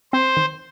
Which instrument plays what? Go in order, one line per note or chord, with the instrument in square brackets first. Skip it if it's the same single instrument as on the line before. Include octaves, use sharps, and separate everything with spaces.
[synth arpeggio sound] C4 [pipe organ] C5
[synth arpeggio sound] D#3